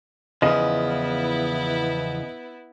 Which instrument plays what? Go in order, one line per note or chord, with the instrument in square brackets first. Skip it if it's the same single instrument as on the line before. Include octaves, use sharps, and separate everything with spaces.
[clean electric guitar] E2 C#3 F3 [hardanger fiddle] B3 E4 [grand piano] D#5